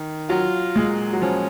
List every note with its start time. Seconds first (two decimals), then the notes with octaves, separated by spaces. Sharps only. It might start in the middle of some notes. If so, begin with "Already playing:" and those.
Already playing: D#3
0.30 F#3 F4
0.76 A#2 G#3
1.13 F#3
1.22 F3 C#4